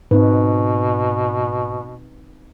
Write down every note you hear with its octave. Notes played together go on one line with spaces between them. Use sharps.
G#2 B2 C4 D#4 B4